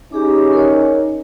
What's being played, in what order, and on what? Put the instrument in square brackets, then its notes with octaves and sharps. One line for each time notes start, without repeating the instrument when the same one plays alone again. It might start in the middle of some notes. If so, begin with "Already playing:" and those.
[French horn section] C#4 D#4 [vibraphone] G4 G#4 D6
[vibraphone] A#4 C#5